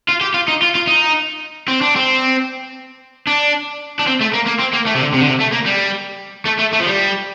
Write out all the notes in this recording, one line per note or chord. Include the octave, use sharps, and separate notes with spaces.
F4
G4
F4
D#4
F4
F4
D#4
C4
D4
C4
D4
D4
C4
A3
A#3
A#3
C4
A#3
A3
C3
D3
C3
D3
C3
A3
A#3
G3
A3
A3
A3
F3
G3